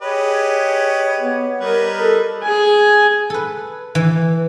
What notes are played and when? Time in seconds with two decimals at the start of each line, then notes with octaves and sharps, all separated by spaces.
0.01 G4 G#4 B4 C#5 D#5
1.19 B3
1.60 G3 A#4 B4 D#5
2.01 A4
2.43 G#4 G#5
3.30 A4 B4
3.95 E3